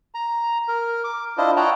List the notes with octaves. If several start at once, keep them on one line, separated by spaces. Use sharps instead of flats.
A#5
A#4
D6
D4 E4 F4 C5 D#5
C#5 D#5 F#5 G5 A5 A#5